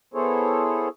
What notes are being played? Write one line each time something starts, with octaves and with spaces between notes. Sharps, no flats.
B3 E4 G#4 A4 C5 C#5